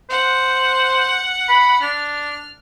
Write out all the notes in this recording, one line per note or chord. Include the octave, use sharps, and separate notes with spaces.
C5 F#5
B5
D4 F6